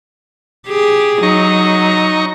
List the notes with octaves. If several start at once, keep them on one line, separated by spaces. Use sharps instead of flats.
G4 G#4
F#3 D#4 A#5 C#6